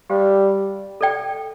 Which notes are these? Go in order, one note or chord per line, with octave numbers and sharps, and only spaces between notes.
G3 G4 C5 F5 C6
A4 D5 G5